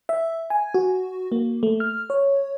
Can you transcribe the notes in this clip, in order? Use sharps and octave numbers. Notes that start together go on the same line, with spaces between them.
E5
G#5
F#4
A#3
A3
F6
C#5